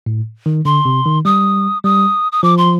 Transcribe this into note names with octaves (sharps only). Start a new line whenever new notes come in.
A2
D#3
D3 C6
C3
D#3
G3 D#6
G3 D#6
D#6
F3 D6
C6